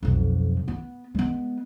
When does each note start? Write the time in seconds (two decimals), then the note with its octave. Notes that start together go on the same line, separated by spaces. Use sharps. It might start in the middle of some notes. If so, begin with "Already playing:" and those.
0.03 B1 F2
0.68 B3
1.15 G#3 B3